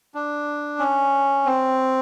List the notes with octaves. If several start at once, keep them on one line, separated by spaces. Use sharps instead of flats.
D4
C#4
C4